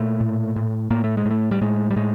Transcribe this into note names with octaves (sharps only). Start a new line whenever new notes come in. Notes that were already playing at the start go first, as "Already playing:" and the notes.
Already playing: A#2 A3
A2
A2
A2 A#3
A3
G#3
A2
A3
G3
A2 G#3
G3
A2 G#3